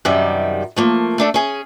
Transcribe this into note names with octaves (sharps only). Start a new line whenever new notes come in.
F#2 C3 D#3 G3
F3 A3 A#3
A3 D4 A4
C#4 G#4